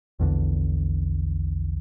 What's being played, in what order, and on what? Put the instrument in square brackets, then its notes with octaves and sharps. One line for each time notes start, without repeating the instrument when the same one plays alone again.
[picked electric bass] A#1 E2 D3